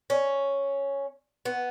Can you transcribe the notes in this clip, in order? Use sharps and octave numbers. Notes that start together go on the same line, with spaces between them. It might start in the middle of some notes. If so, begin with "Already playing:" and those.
C#4
B3